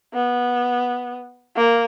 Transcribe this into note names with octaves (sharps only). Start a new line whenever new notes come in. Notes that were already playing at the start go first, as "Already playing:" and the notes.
B3
A#3